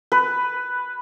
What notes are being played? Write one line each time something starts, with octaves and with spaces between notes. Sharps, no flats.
B4